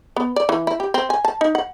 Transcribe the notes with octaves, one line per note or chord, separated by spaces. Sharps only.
B3
D5
E3
E4
G4
C4
G#5
A5
D#4
F#5